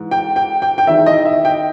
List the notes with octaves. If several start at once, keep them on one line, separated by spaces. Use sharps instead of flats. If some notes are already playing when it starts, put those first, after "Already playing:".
Already playing: G#2 E3
G5
G5
G5
G5
E2 D#3 E5
D#5
E5
G5